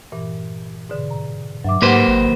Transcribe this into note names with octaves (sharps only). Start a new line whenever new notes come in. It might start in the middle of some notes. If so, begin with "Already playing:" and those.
G2 A#2 E3
G#2 B2 D3
A#5
G2 F#3 E5 D6
G#2 A#3 G4 B4 C5 F#5
G#1 D#3